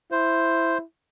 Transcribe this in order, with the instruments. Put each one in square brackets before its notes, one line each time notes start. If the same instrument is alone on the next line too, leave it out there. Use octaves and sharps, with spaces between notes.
[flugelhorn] E4 [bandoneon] C5